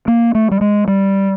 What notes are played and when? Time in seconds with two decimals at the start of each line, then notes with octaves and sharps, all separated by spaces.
0.08 A#3
0.35 A3
0.51 G3
0.61 G#3
0.88 G3